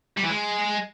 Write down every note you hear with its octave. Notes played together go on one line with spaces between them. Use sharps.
G3
E3
G#3